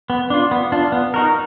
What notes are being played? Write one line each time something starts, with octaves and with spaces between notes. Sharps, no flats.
B3
D4 F4
B3
D4 F4
B3
D#4 F#4 A#4